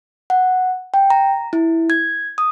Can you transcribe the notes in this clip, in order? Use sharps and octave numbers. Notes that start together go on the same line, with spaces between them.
F#5
G5
A#5
E4
G#6
D#6